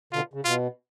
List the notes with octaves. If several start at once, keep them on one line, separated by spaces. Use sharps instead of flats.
B2 D3 F4
C#3
B2 F4